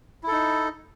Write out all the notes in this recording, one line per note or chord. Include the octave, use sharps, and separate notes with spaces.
D#4 E4 A4